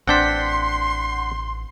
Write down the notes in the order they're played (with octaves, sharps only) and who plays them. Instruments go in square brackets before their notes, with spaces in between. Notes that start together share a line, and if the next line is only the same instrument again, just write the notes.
[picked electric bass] A1 [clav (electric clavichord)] C4 D4 A5 [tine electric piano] F#5 G6 B6 [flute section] C6